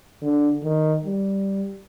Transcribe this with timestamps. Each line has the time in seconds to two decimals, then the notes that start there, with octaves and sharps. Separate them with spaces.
0.23 D3
0.64 D#3
1.05 G3